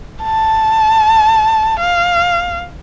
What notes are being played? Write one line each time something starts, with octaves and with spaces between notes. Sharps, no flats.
A5
F5